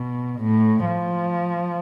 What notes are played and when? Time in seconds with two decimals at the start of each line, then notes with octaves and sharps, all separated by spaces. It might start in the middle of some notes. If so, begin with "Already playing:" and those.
Already playing: B2
0.41 A2
0.85 F3